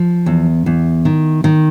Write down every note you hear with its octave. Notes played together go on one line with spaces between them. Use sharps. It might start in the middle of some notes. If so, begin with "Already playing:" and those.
Already playing: F3
E2
E2
D#3
D#3